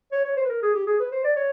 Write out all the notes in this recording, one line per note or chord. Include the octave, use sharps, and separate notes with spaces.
C#5
C#5
C5
B4
A#4
G#4
G4
G#4
B4
C5
D5
C#5